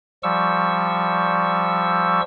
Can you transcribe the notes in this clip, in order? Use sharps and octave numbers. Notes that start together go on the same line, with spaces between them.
F3 G3 C#6 E6